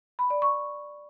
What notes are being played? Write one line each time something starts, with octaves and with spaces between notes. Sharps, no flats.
B5
D5
C#6